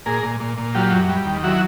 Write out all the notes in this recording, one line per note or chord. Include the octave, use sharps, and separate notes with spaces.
A#2 G#4 A#4
A#2
A#2
A#2
F#3 F4 G4
F#2
G3
D#2
F#3 E4 F#4